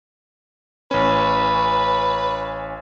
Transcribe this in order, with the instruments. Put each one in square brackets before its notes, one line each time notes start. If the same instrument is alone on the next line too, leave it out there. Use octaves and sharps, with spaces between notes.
[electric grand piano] A1 C#4 [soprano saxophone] B4